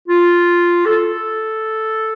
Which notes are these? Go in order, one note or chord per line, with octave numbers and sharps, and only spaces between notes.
F4
A4